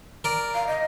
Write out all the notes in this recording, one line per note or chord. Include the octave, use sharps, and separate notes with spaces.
A#4 D5
F5
D#5